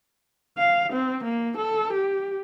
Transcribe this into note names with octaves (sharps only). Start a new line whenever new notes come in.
F5
C4
A#3
A4
G4